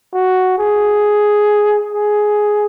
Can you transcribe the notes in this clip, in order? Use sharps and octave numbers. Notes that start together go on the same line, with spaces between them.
F#4
G#4
G#4